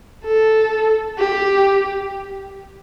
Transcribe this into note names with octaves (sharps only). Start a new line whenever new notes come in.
A4
G4